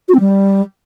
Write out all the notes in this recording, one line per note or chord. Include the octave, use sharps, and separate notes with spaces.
F#4
C4
G3